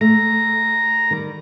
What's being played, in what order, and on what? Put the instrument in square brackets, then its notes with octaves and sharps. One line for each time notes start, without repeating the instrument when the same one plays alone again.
[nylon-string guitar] A3 [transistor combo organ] A#5
[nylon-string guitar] D#3 G3